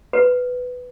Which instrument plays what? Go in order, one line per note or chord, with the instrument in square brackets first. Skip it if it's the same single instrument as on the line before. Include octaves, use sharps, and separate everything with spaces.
[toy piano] B4